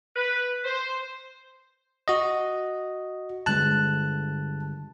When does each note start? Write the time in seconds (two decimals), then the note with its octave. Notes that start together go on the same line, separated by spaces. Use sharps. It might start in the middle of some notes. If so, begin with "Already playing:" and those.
0.16 B4
0.64 C5
2.08 F#4 D#5
3.46 G2 D3 G#3 A5 F#6